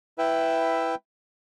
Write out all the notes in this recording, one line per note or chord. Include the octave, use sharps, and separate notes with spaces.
E4 B4 E5 G5